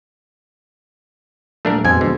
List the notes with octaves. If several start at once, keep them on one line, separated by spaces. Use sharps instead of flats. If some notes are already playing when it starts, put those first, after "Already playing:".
D#1 A#1 A3 D4 A#4
F2 G#2 B2 C5 G#5
F2 D3 D#5